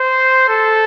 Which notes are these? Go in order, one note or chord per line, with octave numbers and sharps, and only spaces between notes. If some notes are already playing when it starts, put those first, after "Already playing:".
Already playing: C5
A4